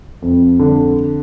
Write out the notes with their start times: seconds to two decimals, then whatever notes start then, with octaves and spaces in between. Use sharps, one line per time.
0.22 F2
0.59 D3